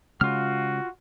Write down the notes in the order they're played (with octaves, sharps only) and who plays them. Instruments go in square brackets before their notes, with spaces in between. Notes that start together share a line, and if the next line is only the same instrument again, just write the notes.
[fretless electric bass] C#3 G#3 C#4 [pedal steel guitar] F4 F6 [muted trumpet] F#4